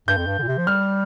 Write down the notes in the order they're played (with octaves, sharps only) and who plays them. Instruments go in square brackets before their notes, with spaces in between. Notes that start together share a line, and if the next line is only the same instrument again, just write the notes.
[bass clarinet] G2 [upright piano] G6
[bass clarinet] F2
G2
D3
A#2
C3
F3
[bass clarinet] G3 [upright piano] F6